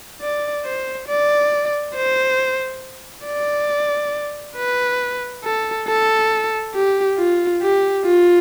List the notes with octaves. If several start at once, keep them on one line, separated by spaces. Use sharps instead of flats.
D5
C5
D5
C5
D5
B4
A4
A4
G4
F4
G4
F4